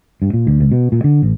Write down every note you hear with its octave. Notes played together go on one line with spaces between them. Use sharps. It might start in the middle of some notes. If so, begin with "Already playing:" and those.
G2
A#2
D2
C#2
B2
A#2
D3
A1